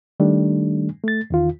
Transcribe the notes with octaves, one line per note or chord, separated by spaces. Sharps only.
D#3 G3 A3 D4
A3 A6
E2 D#3 F4